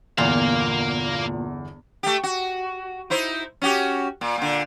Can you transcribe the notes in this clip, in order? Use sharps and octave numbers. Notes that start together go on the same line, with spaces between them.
G1 E2 A#2 A#3 F5
A3 G4
F#4
D#4 E4 C5
C#4 F#4 G4
A#2
A#2 D3